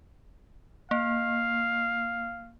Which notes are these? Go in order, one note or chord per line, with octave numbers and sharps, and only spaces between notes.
A#3 F5